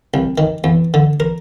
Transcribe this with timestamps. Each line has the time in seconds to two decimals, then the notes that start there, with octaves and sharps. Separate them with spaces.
0.14 C2
0.38 D#3
0.64 E2
0.94 D3
1.20 A#4